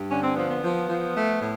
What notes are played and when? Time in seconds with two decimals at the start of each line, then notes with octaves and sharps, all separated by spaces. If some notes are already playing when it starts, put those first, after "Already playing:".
Already playing: G2
0.10 D3 C#4
0.23 C4
0.36 F3 B3
0.49 B3
0.63 F3
0.89 F3
1.14 A3
1.40 A2